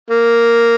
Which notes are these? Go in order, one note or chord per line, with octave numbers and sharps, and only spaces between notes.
A#3